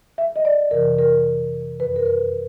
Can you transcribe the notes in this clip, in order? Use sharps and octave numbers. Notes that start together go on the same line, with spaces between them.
E5
D#5
D5
F2 C3 E3 A#4
A#4
F#2 D#3 B4
A#4
B4